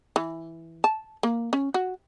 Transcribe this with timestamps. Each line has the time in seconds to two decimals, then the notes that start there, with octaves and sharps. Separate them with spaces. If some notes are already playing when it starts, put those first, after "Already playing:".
0.16 E3
0.84 A5
1.23 A#3
1.53 C#4
1.74 F#4